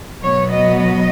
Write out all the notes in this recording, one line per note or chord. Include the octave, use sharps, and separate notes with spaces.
B2 F#3 B3 C#5
D#5
D#5